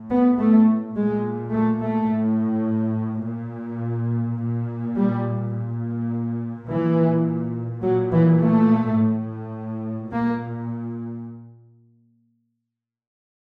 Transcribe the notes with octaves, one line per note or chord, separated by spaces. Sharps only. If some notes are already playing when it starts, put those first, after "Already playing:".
Already playing: A2
B3
A3
A#2 G#3
A3
A3
A2
A#2
A#2
G3
A#2
A#2 E3
A#2 F#3
E3
A3
A2
A#2 A#3